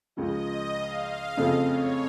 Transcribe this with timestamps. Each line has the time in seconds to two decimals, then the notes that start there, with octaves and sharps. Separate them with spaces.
0.16 C#2 C#3 F3 D#5
0.77 F5
1.37 F2 C#3 A3 C4 D#5
1.68 C#5